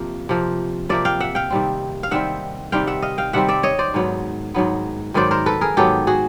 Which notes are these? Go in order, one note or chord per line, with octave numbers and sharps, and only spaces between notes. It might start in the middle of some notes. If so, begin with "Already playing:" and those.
Already playing: C3 F3 A#3
C3 F3 A#3
C3 F3 A#3 D5 E5
F5 G5
E5 F#5
F5 G5
C3 D#3 G3 C4
F5
C3 D#3 G3 C4 E5 F#5
C3 D#3 G3 C4 F5 G5
E5 F#5
D#5 F5
F5 G5
C3 D#3 G3 C4 E5 F#5
D5 E5
C#5 D#5
C5 D5
G#2 D#3 F#3 B3
G#2 D#3 F#3 B3
G#2 D#3 F#3 B3 C5 D5
A#4 C5
A4 B4
G#4 A#4
G#2 D#3 F#3 B3 G4 A4
F#4 G#4